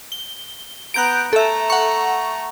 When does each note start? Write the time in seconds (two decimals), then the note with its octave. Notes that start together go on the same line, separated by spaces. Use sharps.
0.12 G7
0.94 B3 A#5 F#6 G6 D7
1.33 A3 A4 E5 A#5
1.70 F#5 C#6